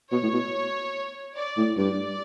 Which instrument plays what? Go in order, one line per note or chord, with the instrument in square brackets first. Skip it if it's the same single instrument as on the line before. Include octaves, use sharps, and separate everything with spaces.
[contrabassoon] B2 [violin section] C#5
[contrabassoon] A2
B2
[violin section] D5
[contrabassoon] A2
[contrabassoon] G2 [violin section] D5